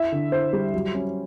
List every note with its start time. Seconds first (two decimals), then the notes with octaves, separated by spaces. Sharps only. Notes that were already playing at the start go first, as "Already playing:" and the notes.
Already playing: E4 E5
0.12 D3
0.32 E4 C5
0.53 G3
0.74 F#3
0.94 C#4